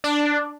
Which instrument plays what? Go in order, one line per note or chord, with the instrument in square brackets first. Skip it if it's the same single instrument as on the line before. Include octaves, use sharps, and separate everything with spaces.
[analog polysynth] D4